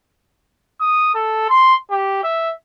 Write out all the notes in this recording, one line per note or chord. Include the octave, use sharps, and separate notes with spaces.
D#6
A4
C6
G4
E5